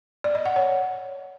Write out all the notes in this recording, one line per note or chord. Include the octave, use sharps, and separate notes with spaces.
D5
D#5
F#5
C#5